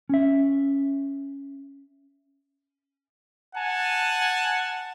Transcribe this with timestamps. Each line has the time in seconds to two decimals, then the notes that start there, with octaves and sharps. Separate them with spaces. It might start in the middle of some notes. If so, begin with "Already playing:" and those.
0.09 C#4 E5
3.56 F#5 G#5 A5